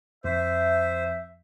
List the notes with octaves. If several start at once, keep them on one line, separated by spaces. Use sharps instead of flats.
F2 C5 E5